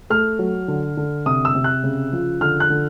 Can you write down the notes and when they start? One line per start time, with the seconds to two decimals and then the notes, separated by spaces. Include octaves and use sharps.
0.10 A3 F6
0.39 F#3
0.68 D3
0.97 D3
1.26 C3 D#6
1.45 E6
1.55 C3
1.64 F#6
1.83 C#3
2.13 F3
2.41 D3 F6
2.60 F#6
2.70 D3